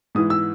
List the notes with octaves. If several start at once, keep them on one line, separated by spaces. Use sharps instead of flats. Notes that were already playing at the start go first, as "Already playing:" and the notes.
G#2 E3 D#6
E6